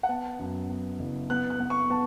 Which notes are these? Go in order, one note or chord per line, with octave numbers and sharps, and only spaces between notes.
F#5
B3 A5
F#2
B3
F#1
B3 F#6
F#6
B3
C#6
B3 A5